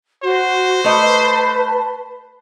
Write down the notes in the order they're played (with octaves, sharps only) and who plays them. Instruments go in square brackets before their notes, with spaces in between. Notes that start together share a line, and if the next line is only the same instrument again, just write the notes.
[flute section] F#4 [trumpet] C5
[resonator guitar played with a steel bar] A3 D#5 [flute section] B4 A5